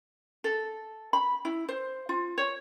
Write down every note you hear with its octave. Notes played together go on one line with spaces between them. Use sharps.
A4
B5
E4
C5
F4
C#5